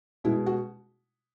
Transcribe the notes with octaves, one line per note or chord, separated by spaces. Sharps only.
B2 G#3 E4
F#4